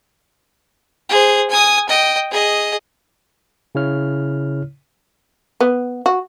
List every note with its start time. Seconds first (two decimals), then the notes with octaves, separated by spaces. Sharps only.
1.09 G#4 C5
1.50 G#5 D#6
1.89 D#5 G5
2.31 G#4 D#5
3.75 C#3 E4 C#5 F6
5.61 B3
6.06 F#4